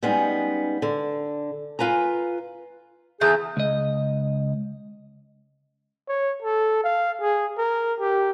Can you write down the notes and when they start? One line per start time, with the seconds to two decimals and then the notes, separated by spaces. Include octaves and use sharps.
0.03 G3 G#3 B3 C#4 D#4
0.82 D3
1.79 F4 B4 G#5 A#5
3.21 E2 E3 A3 G#4 G6
3.57 C#2 D#5
6.08 C#5
6.42 A4
6.84 F5
7.21 G#4
7.58 A#4
8.00 G4